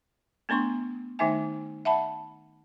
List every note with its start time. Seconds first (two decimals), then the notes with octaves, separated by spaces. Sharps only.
0.49 A3 B3 D4 C6 C#6
1.19 D#3 A3 D#4 E5 G#5
1.85 E5 F#5 A5 B5